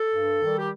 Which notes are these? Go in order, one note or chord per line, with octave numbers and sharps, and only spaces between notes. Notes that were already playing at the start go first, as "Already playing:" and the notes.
Already playing: A4
G2
D#3 G3
G4